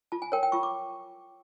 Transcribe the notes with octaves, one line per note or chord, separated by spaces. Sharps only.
F4 A5
G#5
A#4 C#5 G5
G5
F4 C#6
D6